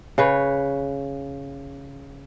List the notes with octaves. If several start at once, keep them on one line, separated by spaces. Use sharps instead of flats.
C#3 B4 C#5